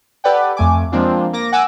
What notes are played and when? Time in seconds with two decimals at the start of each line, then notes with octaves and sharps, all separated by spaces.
0.24 G4 A4 B4 D5 F#5 G5
0.57 F2 A3 G#5 D6
0.92 F3 G#3 A#3 C4 D4 F4
1.33 A#3 D6 A#6
1.52 F#5 G#5 D6 E6 F#6